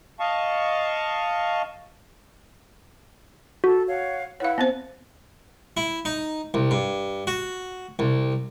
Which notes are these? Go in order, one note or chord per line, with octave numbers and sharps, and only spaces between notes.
D#5 F5 A5 C#6
F#4 A4 A5
C#5 F5 F#5
E4 B4 C#5 F5 F#5
B3 C4 C5
E4
D#4
C2
G2
F#4
C2